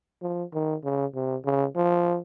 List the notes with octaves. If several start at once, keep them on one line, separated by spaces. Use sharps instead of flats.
F3
D#3
C#3
C3
C#3
F3